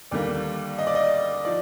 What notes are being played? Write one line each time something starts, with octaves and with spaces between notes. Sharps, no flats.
D#2 D3 G3 A#3 D5
D#5
D5
D#5
F3 D5